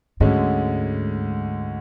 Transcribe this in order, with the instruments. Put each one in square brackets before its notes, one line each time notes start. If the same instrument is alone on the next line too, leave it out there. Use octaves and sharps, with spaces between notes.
[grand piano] D2 D3 G#3 C#4 [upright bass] G#2